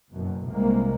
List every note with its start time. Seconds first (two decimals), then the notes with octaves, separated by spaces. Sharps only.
0.13 F#1 F#2 B2
0.48 C2 G#3 A#3